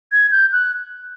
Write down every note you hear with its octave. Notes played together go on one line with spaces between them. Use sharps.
G#6
G6
F#6